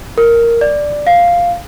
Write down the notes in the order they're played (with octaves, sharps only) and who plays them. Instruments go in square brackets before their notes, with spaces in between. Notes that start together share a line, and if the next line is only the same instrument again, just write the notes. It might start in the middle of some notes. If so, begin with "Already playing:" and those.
[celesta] A#4
D5
F5